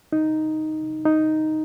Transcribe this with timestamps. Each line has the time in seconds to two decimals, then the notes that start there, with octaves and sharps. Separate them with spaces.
0.13 D#4
1.05 D#4